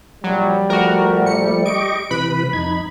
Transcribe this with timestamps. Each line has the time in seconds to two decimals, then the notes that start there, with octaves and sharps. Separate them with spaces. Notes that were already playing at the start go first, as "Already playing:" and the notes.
0.24 A#1 F#3 G3
0.70 F3 A3 F#4 A#4
1.22 A#1 C#7
1.66 G4 D#5 C#6 D7
2.11 C3 E3 B4 B5
2.53 F2 D#4 G#6